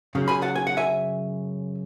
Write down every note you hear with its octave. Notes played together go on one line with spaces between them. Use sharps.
F#2 C#3
G#5 B5
F#5 A5
G#5
F#5
E5 G#5